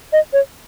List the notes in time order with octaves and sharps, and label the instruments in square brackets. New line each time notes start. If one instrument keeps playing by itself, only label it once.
[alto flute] D#5
C#5